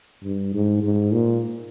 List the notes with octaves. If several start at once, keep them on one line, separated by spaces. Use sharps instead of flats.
G2
G#2
G#2
A#2